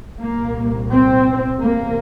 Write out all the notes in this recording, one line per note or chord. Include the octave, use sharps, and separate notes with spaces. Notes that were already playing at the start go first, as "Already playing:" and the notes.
C2 A#2 A#3
C4
E2 C3 A#3